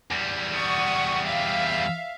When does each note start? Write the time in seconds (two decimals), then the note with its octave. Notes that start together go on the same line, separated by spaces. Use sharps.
0.11 E2 G3
0.52 F#5 C#6 D#6
1.26 E5 F5